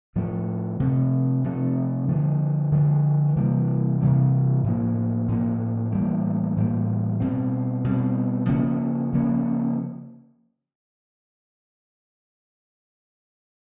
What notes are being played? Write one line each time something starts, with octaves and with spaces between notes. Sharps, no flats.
A2 F3 A3
C3 F3 A3
C3 F3 A3
D3 F3 G#3
D3 F3 G#3
C3 E3 G3 A#3
C3 E3 G3 A#3
A2 F3 A#3
A2 F3 A#3
A2 E3 G3 A#3
A2 E3 G3 A#3
B2 G3 C4
B2 G3 C4
C#3 F3 A#3 C#4
C#3 F3 A#3 C#4